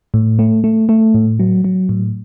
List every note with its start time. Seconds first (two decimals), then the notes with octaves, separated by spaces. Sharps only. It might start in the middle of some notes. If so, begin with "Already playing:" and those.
0.14 A2
0.39 A3
0.64 A3
0.89 A3
1.14 A2
1.40 F#3
1.64 F#3
1.89 A2